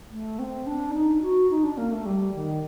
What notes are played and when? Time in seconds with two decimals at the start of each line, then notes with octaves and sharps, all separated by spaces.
0.11 A3
0.39 C4
0.67 D4
0.94 D#4
1.22 F#4
1.51 D#4
1.64 D4
1.78 A#3
1.91 A3
2.06 G3
2.34 D#3